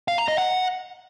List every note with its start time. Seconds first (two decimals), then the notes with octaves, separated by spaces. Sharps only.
0.08 F5
0.18 A#5
0.28 D#5
0.38 F#5